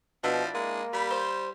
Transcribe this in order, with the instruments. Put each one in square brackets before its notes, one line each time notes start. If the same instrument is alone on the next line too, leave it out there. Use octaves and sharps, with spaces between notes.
[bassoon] B2 [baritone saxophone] F3 [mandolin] D4 E4
[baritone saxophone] G#3 [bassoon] A#3
[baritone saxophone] G3 [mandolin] B5
[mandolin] C5